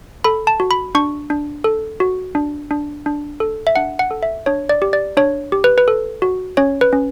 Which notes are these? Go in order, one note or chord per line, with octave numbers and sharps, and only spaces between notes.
A4 B5
A5
F#4
B5
D4 C#6
D4
A4
F#4
D4
D4
D4
A4
E5
D4 F#5
F#5
A4
E5
D4 C#5
D5
G4
D5
D4 C#5
G4
B4
B4
A4
F#4
C#4 C#5
B4
C#4